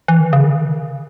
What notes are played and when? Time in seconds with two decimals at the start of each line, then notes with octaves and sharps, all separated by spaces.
0.08 E3
0.20 D#3
0.33 C#3
0.44 D#3